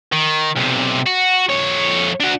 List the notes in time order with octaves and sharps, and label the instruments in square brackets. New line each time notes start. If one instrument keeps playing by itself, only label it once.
[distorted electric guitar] D#3
B1 C3
F#4
F2 C#5
D4 F#4